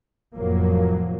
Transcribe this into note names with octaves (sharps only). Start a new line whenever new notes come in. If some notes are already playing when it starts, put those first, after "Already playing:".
F1 F2 A2 F3 F#3 A#3